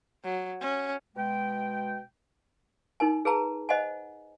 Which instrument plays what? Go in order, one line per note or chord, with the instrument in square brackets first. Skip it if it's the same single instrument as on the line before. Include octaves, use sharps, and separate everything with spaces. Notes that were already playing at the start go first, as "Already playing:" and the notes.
[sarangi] F#3
C#4
[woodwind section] B2 G#3 G5
[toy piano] D#4 A#4 G#5
G#4 B4 A5 A#5
C5 D#5 F#5 G#5